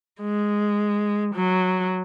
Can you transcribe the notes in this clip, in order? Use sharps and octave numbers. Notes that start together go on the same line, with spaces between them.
G#3
F#3